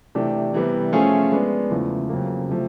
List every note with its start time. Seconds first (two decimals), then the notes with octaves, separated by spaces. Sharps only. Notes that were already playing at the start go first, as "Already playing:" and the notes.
0.15 C3 E3 A3 D4 G4
0.54 C3 E3 G3 B3 E4
0.92 F3 A3 C#4 F4 G#4
1.32 G#3 B3 D4
1.70 E2 C#3 F3 A3
2.09 F2 C#3 F#3 A#3
2.49 C3 F3 A3